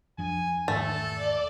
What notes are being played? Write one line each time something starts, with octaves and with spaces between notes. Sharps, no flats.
F2 F3 D4 G#5
E1 G#2 D#3 A3 A4
D5